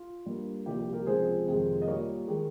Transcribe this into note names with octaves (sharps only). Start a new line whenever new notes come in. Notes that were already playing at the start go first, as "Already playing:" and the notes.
Already playing: F4
G2 G3 A#3
C2 A#2 F3 G4
G4
G4 A#4
C#2 C3 F3 C4 G#4 C5
F2 C3 D#3 G#3
D#5
A#2 G3 A#3 A#4 C#5
D#3 G#3